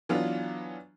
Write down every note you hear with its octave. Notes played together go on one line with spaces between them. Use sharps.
E3 F#3 B3 D4 F4